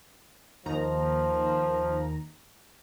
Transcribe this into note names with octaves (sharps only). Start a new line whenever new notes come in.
D#2 D#3 F3 A#5